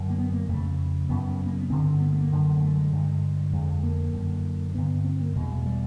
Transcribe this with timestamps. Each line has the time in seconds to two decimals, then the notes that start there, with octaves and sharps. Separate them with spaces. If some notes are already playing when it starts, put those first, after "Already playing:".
Already playing: F#2 D3
0.10 A#3
0.19 B3
0.34 A#3
0.48 F2 C#3 A3
1.09 F#2 C#3 B3
1.46 A#3
1.58 B3
1.70 G2 D3 C4
2.00 B3
2.11 A3
2.21 A#3
2.32 F#2 D3
2.56 A#3
2.61 A3
2.77 G#3
2.92 G2 D3
3.53 F2 D3 G#3
3.83 A#3
4.13 F#2 D3
4.75 G2 D3 B3
5.04 C4
5.21 A#3
5.35 E2 B2 G#3
5.56 G#3
5.66 G3